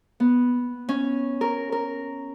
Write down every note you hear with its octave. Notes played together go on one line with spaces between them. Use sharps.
B3
C#4
A#4
A#4